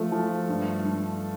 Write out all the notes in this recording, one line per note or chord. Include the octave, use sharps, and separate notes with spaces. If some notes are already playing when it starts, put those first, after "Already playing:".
Already playing: F3 A3
F3
G2
G2